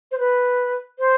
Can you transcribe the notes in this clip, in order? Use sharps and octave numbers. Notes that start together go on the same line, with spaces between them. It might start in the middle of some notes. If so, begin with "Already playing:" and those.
C5
B4
C5